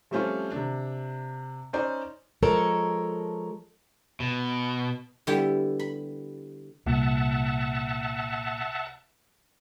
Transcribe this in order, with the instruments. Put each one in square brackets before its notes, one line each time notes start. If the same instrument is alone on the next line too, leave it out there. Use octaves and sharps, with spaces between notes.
[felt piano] F3 G3 A3 C4 C#4 F4
C3 D4
C#4 D#4 C5 D5
[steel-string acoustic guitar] F3 G#3 A4 A#4 C#5
[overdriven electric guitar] B2
[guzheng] D3 G3 B3 E4 G4
B5
[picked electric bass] C2 [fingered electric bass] A#2 [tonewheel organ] E5 F#5 A5